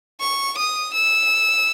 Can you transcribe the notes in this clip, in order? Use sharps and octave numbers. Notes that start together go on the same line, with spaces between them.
C#6
D#6
E6